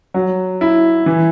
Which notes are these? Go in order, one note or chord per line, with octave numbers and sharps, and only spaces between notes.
F#3
E4
E3